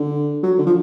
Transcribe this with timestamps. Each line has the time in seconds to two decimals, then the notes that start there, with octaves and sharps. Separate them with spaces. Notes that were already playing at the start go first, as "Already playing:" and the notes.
Already playing: D3
0.43 F#3
0.59 D3
0.67 F3